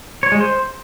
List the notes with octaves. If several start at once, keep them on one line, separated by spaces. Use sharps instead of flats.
C#5
G#3
C5